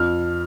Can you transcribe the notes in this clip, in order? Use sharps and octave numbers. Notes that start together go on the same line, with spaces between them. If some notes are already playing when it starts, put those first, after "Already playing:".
Already playing: F2 F6